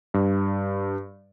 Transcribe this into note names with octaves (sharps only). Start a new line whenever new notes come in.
G2